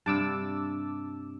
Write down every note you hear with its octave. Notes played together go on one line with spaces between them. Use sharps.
G2 C3 D5 A5 D6 E6